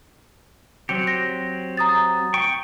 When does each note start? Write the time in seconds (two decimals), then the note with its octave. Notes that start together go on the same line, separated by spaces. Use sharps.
0.89 F#3 C4 G4 C#7
1.07 A#6
1.77 A#5 D#6 A6
2.34 G5 C#6